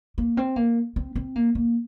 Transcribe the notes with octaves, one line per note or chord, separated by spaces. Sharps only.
A#3
C4
A#3
C4
C4
A#3
A#3